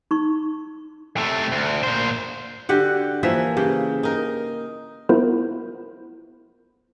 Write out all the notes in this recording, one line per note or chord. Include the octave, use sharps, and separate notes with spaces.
D#4 C#6
C3 A3
D2
A#2 C5
D3 F#4 G4 F#5
E3 F3 A#3 E5
C#3 G4
D#4 A#4
B3 E4 F4 A#4 C5